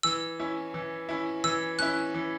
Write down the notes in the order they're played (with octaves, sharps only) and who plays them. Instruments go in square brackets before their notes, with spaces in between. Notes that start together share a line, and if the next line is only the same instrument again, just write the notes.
[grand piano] E3 [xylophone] E6
[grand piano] C#4 E4
E3
C#4 E4
[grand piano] E3 [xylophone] E6
[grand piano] C#4 E4 [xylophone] F#6
[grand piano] E3